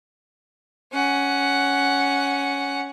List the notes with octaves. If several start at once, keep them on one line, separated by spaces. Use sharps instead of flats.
C#4 F#5